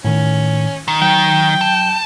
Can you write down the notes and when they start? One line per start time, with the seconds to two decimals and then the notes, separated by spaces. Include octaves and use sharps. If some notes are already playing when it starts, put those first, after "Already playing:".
0.05 A2 D#3 C#4
0.88 D#3
1.02 F#3 G5
1.61 A5